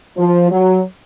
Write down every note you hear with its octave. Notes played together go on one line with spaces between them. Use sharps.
F3
F#3